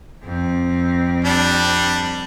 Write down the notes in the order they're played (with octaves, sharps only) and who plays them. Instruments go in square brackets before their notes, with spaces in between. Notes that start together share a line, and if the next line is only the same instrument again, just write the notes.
[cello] F2 C4
[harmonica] G3 D4